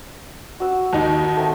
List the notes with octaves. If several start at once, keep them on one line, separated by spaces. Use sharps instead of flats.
F#4 E6
D#2 D#4
A3 C4 G5